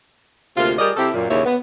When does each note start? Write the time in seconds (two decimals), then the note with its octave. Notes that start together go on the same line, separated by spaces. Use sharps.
0.56 D2 C3 A#3 F4
0.78 G3 G#4 A#4 D5 D#5
0.97 C3 C4 E4 G4 A4
1.14 F#2 A#2
1.29 D#2 A#2 C#3 E4 C#5
1.45 B3